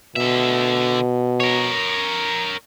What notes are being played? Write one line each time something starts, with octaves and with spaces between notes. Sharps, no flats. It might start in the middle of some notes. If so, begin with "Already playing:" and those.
B2 D3 E5
A#4 C#5